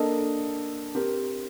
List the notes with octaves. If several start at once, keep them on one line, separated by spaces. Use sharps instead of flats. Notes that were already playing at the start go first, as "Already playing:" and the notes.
Already playing: A#3 D4 A4 D#5
C4 G4 A#4